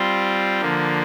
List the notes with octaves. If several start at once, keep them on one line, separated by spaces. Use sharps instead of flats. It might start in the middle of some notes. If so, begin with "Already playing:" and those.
Already playing: G3 C4 F4
D3 F3 A#3